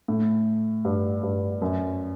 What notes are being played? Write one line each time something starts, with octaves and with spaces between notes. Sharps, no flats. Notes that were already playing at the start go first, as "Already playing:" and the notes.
A2
G2
G2
F#2